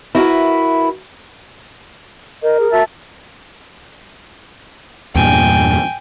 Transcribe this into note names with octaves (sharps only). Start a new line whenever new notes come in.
E4 F#4 A#4 B4
A#4 D#5
G#4
F#4 E5 A5
E2 G2 A#2 G5 G#5